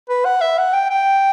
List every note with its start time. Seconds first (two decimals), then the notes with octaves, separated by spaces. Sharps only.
0.09 B4
0.25 F#5
0.41 E5
0.58 F#5
0.74 G5
0.90 G5